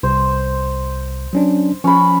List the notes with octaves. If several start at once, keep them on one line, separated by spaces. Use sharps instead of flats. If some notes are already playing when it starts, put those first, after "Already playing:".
C2 C5
F#3 C#4 D4
F3 C#4 B5